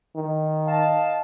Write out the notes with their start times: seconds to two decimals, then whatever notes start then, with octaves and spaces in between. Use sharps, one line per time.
0.16 D#3
0.67 D#5 F5 A5